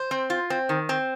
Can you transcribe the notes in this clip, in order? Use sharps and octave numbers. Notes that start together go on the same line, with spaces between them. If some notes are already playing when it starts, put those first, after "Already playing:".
Already playing: C5
C4
F4
C4
D#3
C4